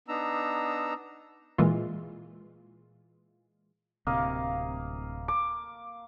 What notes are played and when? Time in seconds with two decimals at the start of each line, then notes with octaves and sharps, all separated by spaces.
0.08 B3 D4 D#4 A#5 E6
1.58 A#2 E3 G#3 F4
4.07 D1 C3 A#3 D#5 F5
5.28 D6